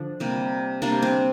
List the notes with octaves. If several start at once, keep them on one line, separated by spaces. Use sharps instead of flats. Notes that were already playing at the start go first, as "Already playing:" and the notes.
Already playing: D3 F3 D4
C3 G3 A#3
C3 G3 A#3 D4
C4